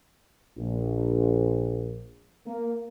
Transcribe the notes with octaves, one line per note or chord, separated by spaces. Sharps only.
A#1
A#3